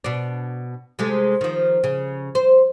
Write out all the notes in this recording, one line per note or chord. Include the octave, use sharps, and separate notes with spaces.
B2 D4
C3 G#3 A3
D#3 F3
C#3
C5